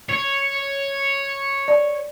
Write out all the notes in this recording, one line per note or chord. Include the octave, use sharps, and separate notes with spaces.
C#5
D5